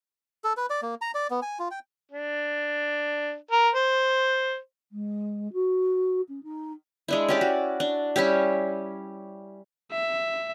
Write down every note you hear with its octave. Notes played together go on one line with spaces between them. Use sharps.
A4
B4
D5
A#3
A#5
D5
B3
G#5
F4
G5
D4
A#4
C5
G#3
F#4
C#4
D#4
G#3 D4 E4
C#4 G4 D5
F#4
D4
G3 C#4 E4 G4
E5